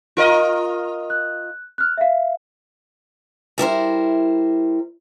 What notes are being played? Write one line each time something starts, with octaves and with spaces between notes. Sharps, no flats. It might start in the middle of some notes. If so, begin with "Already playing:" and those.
F4 A#4 D#5
F#6
F6 F#6
E5 F5
G3 E4 A#4 C5